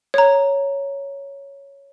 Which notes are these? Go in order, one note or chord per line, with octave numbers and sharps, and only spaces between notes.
C#5 A#5